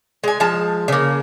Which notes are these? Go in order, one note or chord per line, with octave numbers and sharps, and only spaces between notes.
G#3 G#5
F3 G#3 A5
C#3 A#3